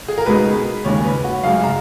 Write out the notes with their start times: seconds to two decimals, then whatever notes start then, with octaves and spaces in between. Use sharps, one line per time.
0.08 G#4
0.18 A#4
0.26 C#2 B2 G#3 D#4 G#4 B4
0.85 D#2 C#3 G#3 C#4 C#5
1.04 B4
1.24 F#4
1.43 F#2 C#3 G#3 F5
1.63 A#5